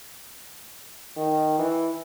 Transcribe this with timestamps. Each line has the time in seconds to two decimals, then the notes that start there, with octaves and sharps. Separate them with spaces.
1.16 D#3
1.59 E3